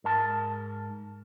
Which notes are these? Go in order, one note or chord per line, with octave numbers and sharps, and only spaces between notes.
G#2 A#4 A5